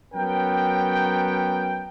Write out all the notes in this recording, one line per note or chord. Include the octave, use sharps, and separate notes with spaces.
F#3 B3 C#4 A#4 G5